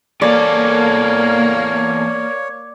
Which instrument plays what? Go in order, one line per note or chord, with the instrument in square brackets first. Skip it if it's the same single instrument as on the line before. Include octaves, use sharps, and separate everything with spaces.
[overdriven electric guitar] E2 A4 [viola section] A#3 [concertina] C#5 [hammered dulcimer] D5